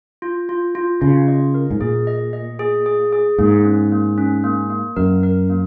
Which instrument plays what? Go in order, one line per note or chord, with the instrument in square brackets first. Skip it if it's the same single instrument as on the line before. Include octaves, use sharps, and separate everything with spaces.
[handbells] F4
F4
F4
[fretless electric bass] C#3 [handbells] F4
[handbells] D#5
A#4
[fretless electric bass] G#2
[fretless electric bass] A#2 [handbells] G#4
[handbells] D#5
D#5
G#4
G#4
G#4
[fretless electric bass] G#2 [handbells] A#3
[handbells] C#4
A#3
C#4
A#3
A#3
[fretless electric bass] F#2 [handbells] A#4
[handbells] A#4
A#3